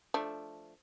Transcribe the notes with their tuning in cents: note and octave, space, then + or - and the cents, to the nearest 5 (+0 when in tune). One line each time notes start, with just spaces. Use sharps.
F3 -5 A3 +0 D4 +0